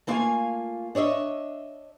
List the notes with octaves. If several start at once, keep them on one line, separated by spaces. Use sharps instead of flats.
A3 A#3 E4 F4 F5 G#5
D4 C#5 D#5 E5